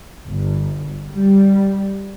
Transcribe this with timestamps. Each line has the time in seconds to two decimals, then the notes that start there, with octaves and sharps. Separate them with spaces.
0.24 G1
1.11 G3